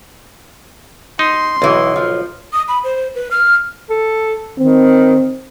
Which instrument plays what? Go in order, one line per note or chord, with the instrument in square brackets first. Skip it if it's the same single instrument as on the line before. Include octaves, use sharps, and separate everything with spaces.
[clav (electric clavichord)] D#4 [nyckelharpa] C6
[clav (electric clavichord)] B1 [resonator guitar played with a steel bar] B2 E3
[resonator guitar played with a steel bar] F3
[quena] D#6
B5
C5
B4
F6
[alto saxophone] A4
[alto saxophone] D#3 [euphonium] C4